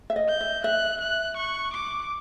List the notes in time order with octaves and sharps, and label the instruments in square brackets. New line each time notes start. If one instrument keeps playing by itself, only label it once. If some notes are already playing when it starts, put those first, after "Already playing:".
[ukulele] E5
D#5
[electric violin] G6
[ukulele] E5
[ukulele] E5 [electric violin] F#6
[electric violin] F#6
C#6
D6